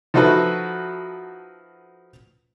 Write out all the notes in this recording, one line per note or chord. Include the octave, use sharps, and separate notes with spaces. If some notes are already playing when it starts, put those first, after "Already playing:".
F3 D#4 F#4 A4 B4 E5